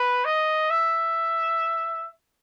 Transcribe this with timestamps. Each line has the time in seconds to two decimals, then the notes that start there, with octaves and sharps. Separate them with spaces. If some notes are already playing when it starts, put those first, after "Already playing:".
Already playing: B4
0.25 D#5
0.70 E5